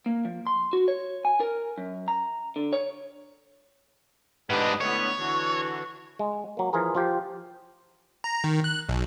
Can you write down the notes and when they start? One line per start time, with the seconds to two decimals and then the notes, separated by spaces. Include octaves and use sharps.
0.06 A#3
0.25 F3
0.47 C6
0.73 F#4
0.88 C#5
1.25 G#5
1.40 A#4
1.78 F#2
2.08 A#5
2.56 D3
2.73 C#5
4.50 G#2 D4 G4 B4 D#5
4.81 A2 D3 B3 C#5
5.19 D3 E3 F#4
6.19 G#3
6.57 F#3 A#3
6.73 E3 F3 F4 G#4 A#4
6.95 F3 F4 G4
8.24 A#5
8.44 D#3
8.64 F#6
8.89 B1